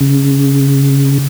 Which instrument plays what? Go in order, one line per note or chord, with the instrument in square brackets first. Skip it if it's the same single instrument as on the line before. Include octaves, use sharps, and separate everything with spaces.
[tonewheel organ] C#3